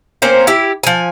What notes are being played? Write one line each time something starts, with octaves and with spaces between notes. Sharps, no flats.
A#3 C4 C#4 C5
E4 G4
F3 G#5